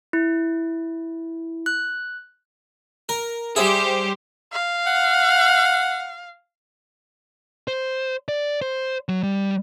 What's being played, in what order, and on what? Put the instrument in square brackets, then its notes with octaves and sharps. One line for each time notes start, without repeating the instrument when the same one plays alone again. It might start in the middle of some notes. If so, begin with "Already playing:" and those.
[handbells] E4
F#6
[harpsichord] A#4
[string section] G3 G4 C5 [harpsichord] G#4 E5
[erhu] F5
[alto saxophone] F#5
[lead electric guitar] C5
D5
C5
F#3
G3